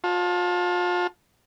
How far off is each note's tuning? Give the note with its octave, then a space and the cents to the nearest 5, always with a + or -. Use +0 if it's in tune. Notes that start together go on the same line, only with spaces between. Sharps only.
F4 +35 A5 +0